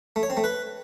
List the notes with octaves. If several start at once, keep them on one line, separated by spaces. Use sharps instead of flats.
A3
C#5
C4
A3
B4